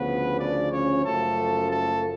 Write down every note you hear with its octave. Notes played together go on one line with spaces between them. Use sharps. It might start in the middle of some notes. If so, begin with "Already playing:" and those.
Already playing: D2 C#3 F3 B3 B4
D4 D5
C#4 C#5
F#1 F#2 F3 A3 A4
A3 A4